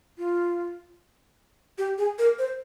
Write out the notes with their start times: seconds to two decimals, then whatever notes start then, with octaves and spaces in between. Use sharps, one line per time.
0.18 F4
1.78 G4
1.98 G#4
2.19 A#4
2.39 C5